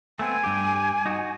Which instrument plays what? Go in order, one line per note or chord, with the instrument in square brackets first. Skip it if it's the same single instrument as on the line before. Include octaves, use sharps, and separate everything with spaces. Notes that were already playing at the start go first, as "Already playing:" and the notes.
[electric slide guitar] A3 B3 C4 [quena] G#5
[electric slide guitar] G2 G4
D#4 F#4